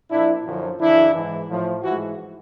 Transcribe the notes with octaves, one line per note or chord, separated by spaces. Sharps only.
A#2 F3 D4 E4
F#2 D3 F3
F#2 C#3 E3 D4 E4
G#2 E3
A2 F3
G#2 E3 E4 F#4